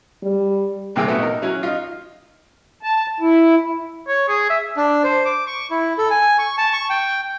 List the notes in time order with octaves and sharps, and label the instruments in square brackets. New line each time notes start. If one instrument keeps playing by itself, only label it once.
[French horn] G3
[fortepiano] G2 C3 A#3 G#4 G5 E6
A3 B3 F#4 A4
D#4 A#4
F#3 C#4 E4
D#4 F4
[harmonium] A5
E4
[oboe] C#5
G#4
E5
[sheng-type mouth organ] D4
C5
D6
C#6
E4
A4
G#5
C#6
A5
C#6
G5